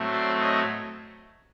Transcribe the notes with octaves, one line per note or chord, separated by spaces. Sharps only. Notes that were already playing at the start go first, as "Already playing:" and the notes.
Already playing: A2 F#3 A3 C4
C5 D5
C#5 D#5